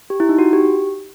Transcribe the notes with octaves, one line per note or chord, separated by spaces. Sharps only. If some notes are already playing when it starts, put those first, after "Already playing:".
G4
E4
D#4
F#4
G4